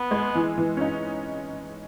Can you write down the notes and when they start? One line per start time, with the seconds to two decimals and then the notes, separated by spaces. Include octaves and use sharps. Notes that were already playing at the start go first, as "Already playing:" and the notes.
Already playing: B3
0.11 G#3
0.35 E3
0.58 E3
0.77 C#4
0.81 D#4